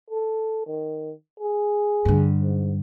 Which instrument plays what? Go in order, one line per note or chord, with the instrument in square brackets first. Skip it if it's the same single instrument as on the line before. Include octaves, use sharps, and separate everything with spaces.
[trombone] A4
D#3
G#4
[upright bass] G2 D3
[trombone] G#2